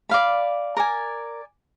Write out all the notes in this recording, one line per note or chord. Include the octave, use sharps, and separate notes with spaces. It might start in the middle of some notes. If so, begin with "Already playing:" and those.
D5 F5 B5
A#4 D5 G#5